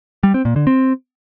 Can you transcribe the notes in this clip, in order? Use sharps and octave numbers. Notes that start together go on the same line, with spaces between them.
G3
C4
A#2
D3
C4